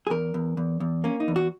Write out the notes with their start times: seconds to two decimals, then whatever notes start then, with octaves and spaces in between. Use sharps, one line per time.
0.07 G#4
0.10 E2 A#4
0.34 E2
0.57 E2
0.80 E2
1.04 A#3 C#4
1.20 D#4
1.28 E2
1.36 F#4